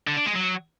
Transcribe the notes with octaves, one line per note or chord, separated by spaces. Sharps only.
D3
D4
G#3
F#3